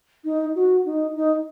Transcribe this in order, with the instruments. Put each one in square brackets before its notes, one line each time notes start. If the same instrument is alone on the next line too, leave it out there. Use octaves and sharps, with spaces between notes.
[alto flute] D#4
F#4
D#4
D#4